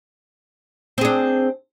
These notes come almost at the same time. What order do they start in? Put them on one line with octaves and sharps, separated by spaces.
C4 G#4 D4